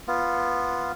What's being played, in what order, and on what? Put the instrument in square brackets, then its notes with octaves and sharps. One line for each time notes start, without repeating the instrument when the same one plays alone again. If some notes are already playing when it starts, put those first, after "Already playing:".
[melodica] B3 F4